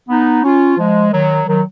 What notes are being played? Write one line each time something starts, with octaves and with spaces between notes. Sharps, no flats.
B3 D#4
C#4 F4
F3 G#3
D#3 F#3
D#3 F#3